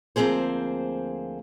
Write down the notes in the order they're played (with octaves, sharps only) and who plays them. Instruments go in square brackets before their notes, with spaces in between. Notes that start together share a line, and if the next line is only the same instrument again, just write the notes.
[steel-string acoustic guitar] D2 F3 A#3 C4 G#4 C5